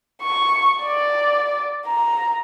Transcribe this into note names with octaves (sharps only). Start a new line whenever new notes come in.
C#6
D5
A#5